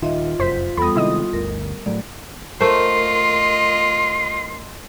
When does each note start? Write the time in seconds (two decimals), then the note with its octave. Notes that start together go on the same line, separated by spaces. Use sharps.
0.02 D#1 D#3 F4 D#5 E5
0.39 F1 F#2 C5 B6
0.77 E2 G3 B3 A4 B5 D#6
0.95 C3 D#3 G#3 E4 D#5 D#6
1.33 G1 D2 A#4
1.86 A2 F#3 A3 D5
2.61 A3 F4 A#4 C5 D#5 C6